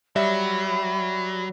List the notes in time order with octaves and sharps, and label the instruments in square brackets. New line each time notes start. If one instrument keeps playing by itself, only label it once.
[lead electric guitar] F#3 [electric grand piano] G3 E5 [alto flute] B5